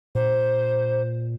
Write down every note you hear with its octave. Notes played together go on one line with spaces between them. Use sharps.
A#2 C5